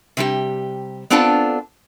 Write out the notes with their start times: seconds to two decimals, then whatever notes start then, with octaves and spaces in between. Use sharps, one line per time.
0.17 C3 G3 G4
1.10 B3 C4 D4 F4 A4 A5